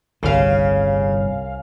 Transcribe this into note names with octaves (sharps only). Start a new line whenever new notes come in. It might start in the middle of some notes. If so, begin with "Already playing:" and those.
G1 C2 A2 C#3 F5